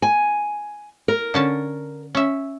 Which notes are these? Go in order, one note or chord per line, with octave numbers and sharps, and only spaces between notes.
G#5
A#4
D3 C#4 A5
C#4 E5